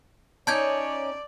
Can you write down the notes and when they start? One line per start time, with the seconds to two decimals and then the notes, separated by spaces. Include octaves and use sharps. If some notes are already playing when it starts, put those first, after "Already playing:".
0.47 C#4 D#4 C#5 D5 A5 G6 G#6